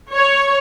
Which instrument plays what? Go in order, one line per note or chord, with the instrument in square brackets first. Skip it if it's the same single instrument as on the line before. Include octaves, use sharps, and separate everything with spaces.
[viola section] C#5